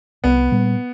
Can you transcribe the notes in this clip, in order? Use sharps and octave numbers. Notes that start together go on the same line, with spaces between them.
C2 B3
A#2 G3